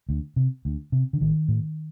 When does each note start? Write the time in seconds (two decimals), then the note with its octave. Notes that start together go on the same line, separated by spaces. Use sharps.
0.09 D2
0.36 C3
0.65 D2
0.92 C3
1.13 D3
1.21 A1 D#3
1.48 A2